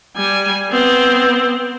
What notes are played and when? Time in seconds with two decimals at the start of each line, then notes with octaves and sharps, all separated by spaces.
0.16 G3 G#5
0.71 B3 C4